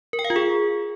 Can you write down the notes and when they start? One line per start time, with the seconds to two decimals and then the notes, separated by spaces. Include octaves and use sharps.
0.13 A#4
0.19 G5
0.24 F5
0.30 F4
0.36 G#4